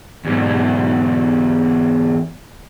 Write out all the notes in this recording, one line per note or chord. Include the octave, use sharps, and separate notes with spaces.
E2 G#2